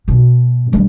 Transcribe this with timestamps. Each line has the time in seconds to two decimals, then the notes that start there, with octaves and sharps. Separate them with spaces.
0.08 B2
0.72 G3 D4